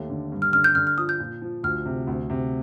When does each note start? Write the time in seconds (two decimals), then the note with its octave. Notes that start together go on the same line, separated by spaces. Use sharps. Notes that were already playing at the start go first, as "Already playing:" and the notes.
Already playing: D#2 A3
0.10 D3
0.32 G2
0.42 F6
0.53 D3 F6
0.64 G6
0.75 D3 F6
0.87 F6
0.97 F3 D#6
1.09 G6
1.20 A#2
1.42 F3
1.63 D2 F6
1.86 C3
2.07 D2
2.30 C3